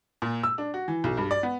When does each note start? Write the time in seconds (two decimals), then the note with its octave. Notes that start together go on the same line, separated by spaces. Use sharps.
0.22 A#2
0.43 E6
0.58 D4
0.74 F#4
0.88 E3
1.04 B1
1.17 G2
1.31 D5
1.43 B3